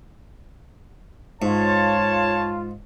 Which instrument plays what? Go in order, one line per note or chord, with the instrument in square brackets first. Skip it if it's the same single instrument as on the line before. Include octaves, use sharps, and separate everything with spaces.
[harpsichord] G#2 [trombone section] F4 [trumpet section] C#5 A5